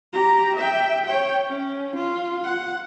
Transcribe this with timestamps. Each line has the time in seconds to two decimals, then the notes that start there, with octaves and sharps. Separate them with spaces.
0.13 G4 A#5
0.55 E5 G5
1.05 C#5 G5
1.47 C#4
1.95 F4
2.44 F#5